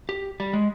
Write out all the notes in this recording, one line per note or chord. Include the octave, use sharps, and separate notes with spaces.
G4
G3
G#3